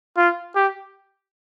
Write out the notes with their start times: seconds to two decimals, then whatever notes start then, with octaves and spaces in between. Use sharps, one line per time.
0.17 F4
0.56 G4